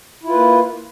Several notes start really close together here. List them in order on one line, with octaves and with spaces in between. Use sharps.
E4 F4 B4 A#3